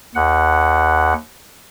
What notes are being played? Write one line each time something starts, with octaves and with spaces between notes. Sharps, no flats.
D#2 F#5